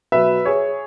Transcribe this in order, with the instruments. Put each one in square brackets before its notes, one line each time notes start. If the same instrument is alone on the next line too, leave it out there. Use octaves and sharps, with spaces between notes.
[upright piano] B2 F#3 B4 E5
G#4 C#5